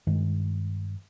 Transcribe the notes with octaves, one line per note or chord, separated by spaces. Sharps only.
G2 D#3 G#3